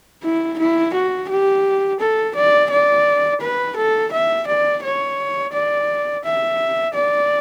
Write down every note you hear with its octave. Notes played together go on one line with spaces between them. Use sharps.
E4
E4
F#4
G4
A4
D5
D5
B4
A4
E5
D5
C#5
D5
E5
D5